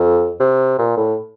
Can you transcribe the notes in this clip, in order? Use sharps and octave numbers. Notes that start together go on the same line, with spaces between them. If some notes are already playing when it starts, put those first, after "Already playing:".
Already playing: F2
C3
A#2
A2